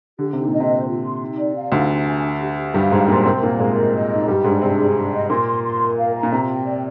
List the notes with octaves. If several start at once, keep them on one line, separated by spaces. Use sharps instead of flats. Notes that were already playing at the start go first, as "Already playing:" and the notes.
D3 G4
C3 D#4
A#2
D#5
C3
C5
F4
C6
D#4
D5
F5
D2 D3 D#4
G#5
G#5
D4
G4
G4
G2 G3 F5
G#2 G#3 C5
A#2 A#3 C6
C3 C4 A#4
A#2 A#3 F5
G#2 G#3 A#4
D#5
D#5
D#4
G2 G3 G4
G#2 G#3 D4
C3 C4 G4
G#4
D4
D#5
A#2 A#3 C6
C6
C6
A#4
F5
A#5
A#2
C3 F4
G5
D5